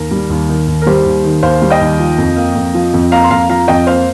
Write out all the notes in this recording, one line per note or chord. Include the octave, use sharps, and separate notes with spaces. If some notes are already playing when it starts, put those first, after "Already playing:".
Already playing: D#2 A#4
G3
D#2
D#3
D#2
A#4
G3 G4 C5
D#2
D#3
D#2 C5 F5
G3
D#5 G5
D#2
F3
F2
A#3
F2
F3
F2
A#3 F5 A#5
C6
F2 F5 A#5
F3 F5 A#5
F2 D#5 G5
A#3 C5 F5